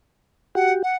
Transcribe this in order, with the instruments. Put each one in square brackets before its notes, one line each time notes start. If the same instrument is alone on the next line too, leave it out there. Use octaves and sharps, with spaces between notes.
[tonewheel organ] F#4 G4 [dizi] F#5
[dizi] F#5